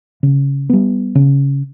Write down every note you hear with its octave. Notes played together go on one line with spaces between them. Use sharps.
C#3
G3 B3
C#3